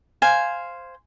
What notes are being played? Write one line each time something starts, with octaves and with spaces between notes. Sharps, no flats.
C5 F5 G#5